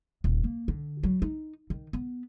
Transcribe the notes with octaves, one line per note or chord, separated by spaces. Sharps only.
D#1
A#3
D3
F#3
D#4
D#3
B3